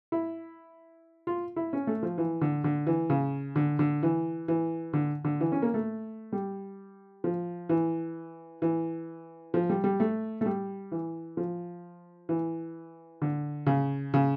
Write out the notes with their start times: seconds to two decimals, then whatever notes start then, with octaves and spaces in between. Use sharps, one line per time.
0.12 E4
1.27 F4
1.56 E4
1.73 C#4
1.87 A3
2.03 F3
2.18 E3
2.41 D3
2.64 D3
2.87 E3
3.10 C#3
3.56 D3
3.79 D3
4.03 E3
4.48 E3
4.93 D3
5.25 D3
5.41 E3
5.52 C#4
5.62 A#3
5.74 A3
6.32 G3
7.24 F3
7.69 E3
8.62 E3
9.54 F3
9.69 G3
9.84 G3
10.00 A3
10.41 A3
10.46 G3
10.92 E3
11.37 F3
12.29 E3
13.22 D3
13.67 C#3
14.14 C#3